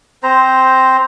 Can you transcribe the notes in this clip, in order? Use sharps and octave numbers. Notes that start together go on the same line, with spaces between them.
C4 C5 A#5